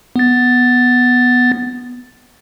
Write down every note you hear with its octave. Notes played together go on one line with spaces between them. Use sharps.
B3 A6